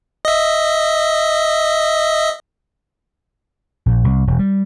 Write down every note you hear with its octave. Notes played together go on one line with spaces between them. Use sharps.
D#5 E5
A#1
C2
E1
G3